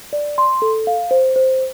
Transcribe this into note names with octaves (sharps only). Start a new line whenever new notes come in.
D5
C6
A4
F5
C5
C5